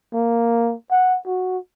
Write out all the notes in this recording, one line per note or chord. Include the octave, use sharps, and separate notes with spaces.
A#3
F#5
F#4